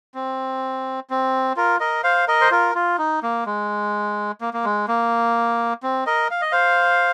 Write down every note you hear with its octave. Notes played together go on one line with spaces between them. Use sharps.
C4
C4
F4 A#4
A#4 D#5
C5 F5
A#4 D#5
C5
F4 A#4
F4
D#4
A#3
G#3
A#3
A#3
G#3
A#3
C4
A#4 D#5
F5
D#5
C5 F5